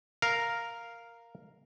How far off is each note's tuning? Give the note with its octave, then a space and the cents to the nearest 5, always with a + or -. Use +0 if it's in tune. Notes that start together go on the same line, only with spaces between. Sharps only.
A#4 +0 F5 +0